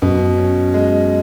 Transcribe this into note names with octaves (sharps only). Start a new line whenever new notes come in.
F#2 B2
C#4
G#3